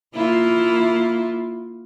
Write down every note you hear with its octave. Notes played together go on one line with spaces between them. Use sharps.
A#3 E4 F4